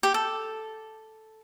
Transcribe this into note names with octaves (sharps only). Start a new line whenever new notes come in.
G4
A4